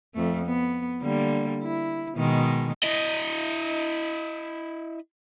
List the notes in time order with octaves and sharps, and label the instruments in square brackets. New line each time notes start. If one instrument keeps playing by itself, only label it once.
[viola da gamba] F2 A3
B3
D3 G3 A#3
E4
B2 D#3 G#3
[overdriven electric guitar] E4 D#5